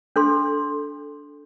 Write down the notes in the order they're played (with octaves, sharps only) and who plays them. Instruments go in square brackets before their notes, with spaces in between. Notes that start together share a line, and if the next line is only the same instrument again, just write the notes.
[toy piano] D4 A4 C6